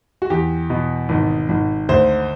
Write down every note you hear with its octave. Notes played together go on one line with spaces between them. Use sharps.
F#4
E2 G4
B2
G#1
G#1
D2 C5